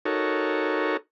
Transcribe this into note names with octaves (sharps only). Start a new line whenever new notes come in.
D#4 F#4 A4 A#4 C#5